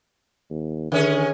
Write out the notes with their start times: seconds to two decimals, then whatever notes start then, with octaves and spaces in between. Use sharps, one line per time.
0.50 D#2
0.92 D3 D#3 C#4 G#4